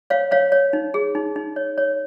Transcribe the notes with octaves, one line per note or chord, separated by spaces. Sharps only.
C5 C#5 F5
C5 C#5 F5
C#5
D#4
G#4
D#4
D#4
C#5
C#5